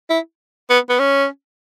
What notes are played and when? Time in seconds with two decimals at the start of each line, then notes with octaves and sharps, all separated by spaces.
0.10 E4
0.70 B3
0.90 B3
0.99 C#4